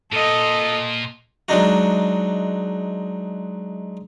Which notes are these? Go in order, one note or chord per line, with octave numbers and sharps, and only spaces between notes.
A#2 F4 A4 D#5
F#3 G#3 D4 D#4 F#4